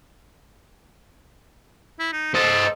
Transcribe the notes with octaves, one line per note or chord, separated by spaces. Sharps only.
E4
D#4
A4 C5 D#5